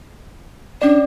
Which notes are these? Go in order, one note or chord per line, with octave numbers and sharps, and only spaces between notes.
C#4 D4 D5